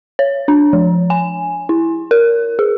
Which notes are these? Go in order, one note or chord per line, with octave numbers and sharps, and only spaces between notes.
C#5
D4
F3
G#5
E4
A#4
G#4